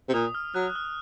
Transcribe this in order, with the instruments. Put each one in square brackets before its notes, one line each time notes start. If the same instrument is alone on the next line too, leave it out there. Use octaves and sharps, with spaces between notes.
[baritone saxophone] C3
[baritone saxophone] A#2 [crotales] D#6
[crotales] F6
[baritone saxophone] F#3 [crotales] F#6
[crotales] F#6
F6